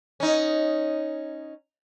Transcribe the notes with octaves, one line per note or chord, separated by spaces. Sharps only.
C#4 D#4